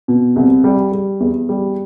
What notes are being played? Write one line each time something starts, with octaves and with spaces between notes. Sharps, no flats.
B2
C2
G3
G3
E2
G3